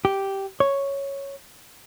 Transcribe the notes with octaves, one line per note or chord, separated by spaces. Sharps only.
G4
C#5